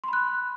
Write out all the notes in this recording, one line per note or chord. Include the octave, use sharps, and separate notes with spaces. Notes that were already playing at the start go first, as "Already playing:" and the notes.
B5 C6 F#6